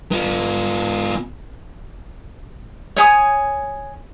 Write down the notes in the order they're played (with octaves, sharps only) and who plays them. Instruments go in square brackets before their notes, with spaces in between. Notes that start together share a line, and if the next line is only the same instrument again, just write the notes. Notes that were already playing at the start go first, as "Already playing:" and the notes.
[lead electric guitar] B3 F4
[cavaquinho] C#5 G#5 D#6